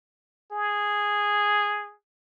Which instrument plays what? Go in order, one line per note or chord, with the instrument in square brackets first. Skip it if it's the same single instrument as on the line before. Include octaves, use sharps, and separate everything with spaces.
[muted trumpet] G#4